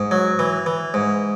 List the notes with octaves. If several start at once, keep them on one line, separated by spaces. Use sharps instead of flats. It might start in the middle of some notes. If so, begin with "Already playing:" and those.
Already playing: G#2
F#3
E3
E3
G#2